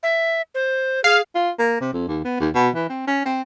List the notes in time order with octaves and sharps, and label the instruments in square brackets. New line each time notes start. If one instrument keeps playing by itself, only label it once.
[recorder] E5
C5
[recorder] G#4 [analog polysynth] F5
[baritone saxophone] F4
A#3
C3
F2
D#2
B3
D#2
B2
E3
C4
C#4
C4